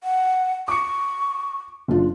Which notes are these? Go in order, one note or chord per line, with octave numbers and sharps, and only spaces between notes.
F#5
C#6 D6 C#7
F#1 D4 F4